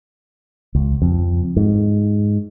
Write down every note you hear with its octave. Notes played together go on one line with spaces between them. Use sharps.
C#2
F2
G#2